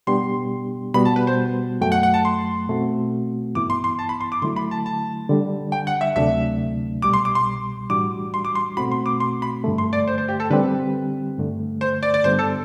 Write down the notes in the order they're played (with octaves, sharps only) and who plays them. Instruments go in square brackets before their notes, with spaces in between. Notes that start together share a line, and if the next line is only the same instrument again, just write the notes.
[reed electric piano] B2 G3 B3 D4 G4 [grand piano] C6
[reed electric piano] B2 G3 B3 F#4 [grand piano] B5
[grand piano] A5
B4
C5
[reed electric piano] F#2 F#3 A3 [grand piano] G5
[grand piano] F#5
F#5
A5
C6
[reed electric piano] B2 A3 C4 F#4
[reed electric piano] G2 E3 B3 E4 [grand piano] D6
[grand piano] C6
C6
A5
B5
C6
D6
[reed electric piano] D3 F#3 A3 E4 [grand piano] C6
[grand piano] B5
A5
A5
[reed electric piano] D3 G3 D4
[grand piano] G5
F#5
E5
[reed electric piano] D2 C3 F#3 A3 D4 [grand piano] E5
[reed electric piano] C2 B2 G3 [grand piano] D6
[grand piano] C6
D6
C6
[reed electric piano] A2 E3 G3 D4 F#4 [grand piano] D6
[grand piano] C6
D6
C6
[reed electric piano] B2 A3 C4 F#4 [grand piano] B5
[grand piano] C6
D6
C6
B5
[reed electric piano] G2 D3 A3
[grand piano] C6
D5
C5
C5
G4
A4
[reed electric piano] D3 G3 C4 G4 [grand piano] B4
[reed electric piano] G2 D3 A3
[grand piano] C5
D5
D5
[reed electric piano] G2 D3 G3 B3 D4 [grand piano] C5
[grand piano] A4